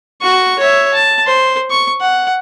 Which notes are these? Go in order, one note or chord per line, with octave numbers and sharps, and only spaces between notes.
F#4 C#6
C#5 E5
A5
C5
C#6
F#5